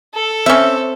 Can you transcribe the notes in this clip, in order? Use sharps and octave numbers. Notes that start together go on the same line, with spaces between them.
A4
C4 C#4 E5